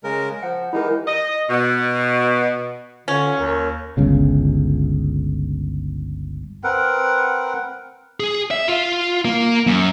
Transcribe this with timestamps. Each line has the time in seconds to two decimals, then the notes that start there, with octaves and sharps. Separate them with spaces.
0.04 C#3 G#3 A#4
0.43 F3 F#5
0.73 E3 G#3 D#4 E4 G4 A#4
1.07 D#5
1.50 B2
3.08 D3 C#4 F4 C#5
3.38 D#2 A#4
3.97 G1 C#2 C#3
6.64 C4 A#4 B4 F#5
8.20 G#4
8.51 E5
8.68 F4
9.25 A#3
9.67 F#2